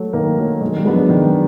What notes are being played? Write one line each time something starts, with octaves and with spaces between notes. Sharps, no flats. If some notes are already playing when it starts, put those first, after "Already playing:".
Already playing: F#3 A3
D#3 A#3
F#3 A3
D#3 G#3
G3
G#3 B3 D4
F#3
D#3 F#3
G#3